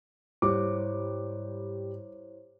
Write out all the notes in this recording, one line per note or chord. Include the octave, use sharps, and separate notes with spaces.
G#2 G3 E4 C5 C#5 D6